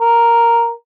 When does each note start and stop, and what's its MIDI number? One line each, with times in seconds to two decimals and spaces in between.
0.01 0.71 70